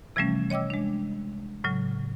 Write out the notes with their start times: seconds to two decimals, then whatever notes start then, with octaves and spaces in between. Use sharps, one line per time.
0.16 C3 E3 F3 G3 A3 C#4
0.50 C#5 D#5 G5 D6 E6
0.70 G#3 D4
1.64 A2 C#3 F#3